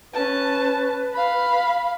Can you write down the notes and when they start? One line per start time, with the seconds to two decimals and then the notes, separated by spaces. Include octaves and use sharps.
0.14 C#4 B4 A5
1.13 F5 B5